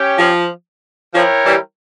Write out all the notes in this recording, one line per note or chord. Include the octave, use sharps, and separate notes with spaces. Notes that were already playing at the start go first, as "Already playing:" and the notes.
Already playing: C#4 G4 C#5 G5
F3
F3 E4 A#4 C#5 G5
E3 G3